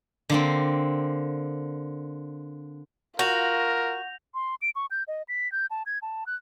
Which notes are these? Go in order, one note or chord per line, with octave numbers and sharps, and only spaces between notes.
D3 A#3 C4
F4 F#4 A#4 G6 A#6 F7
C6
D7
C#6
G6
D#5
B6
G6
A5
G#6
A5
F#6